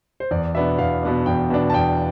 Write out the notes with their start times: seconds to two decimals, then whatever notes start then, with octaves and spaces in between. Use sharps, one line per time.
0.20 C5
0.31 E2 D5
0.55 B2 B3 D4 E5
0.78 E2 F5
1.03 B2 B3 D4
1.26 E2 G5
1.50 B2 B3 D4
1.70 A5
1.74 E2 G5